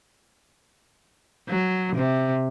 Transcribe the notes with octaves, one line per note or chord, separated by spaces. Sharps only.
F#3
C3